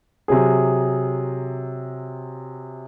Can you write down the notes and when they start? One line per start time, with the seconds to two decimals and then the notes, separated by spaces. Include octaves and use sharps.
0.28 C3 F#3 G#4